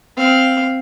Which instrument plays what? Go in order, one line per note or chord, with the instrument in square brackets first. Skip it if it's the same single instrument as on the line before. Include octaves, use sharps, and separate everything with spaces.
[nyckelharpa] C4 F5